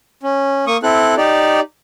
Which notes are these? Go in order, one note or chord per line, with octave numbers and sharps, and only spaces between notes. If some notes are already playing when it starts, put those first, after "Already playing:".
C#4
A#3 C#6 D#6
C4 E4 A4 F#6
D#4 G4 D5